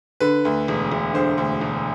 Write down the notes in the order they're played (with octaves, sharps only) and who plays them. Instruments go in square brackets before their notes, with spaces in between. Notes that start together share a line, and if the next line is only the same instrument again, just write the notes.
[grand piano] D3 B4
D2
E1
E1
D3 C5
D2
E1